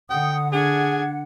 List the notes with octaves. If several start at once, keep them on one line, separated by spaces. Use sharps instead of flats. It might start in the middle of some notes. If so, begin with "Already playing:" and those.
D3 F#5 G5 D#6
D4 G#4 F#5 G#6